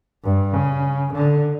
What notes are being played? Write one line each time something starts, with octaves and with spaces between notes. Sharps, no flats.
G2
C#3
D3